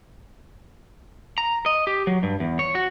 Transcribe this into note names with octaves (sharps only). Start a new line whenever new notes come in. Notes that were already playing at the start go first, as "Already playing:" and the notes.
A#5
D#5
G4
F#3
G2
E2
C#5
F#4